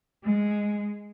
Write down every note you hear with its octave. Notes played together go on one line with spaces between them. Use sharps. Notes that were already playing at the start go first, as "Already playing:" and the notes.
G#3